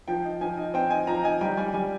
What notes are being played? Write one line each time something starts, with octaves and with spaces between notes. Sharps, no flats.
F3 G5
D#4
F3 G#5
D#4
C4 G5
D#4 G#5
F3 A#5
D#4 G#5
G3 G5
G3 G#5
G3 G#5